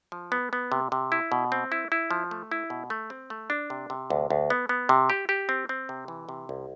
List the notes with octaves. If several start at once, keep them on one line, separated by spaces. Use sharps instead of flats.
F3
B3
B3
C3
C3
E4
B2
C4
E4
E4
F3
A3
E4
B2
A3
C4
A3
D4
C3
C3
D2
D2
B3
B3
C3
G4
G4
C4
C4
C3
E3
C3
C2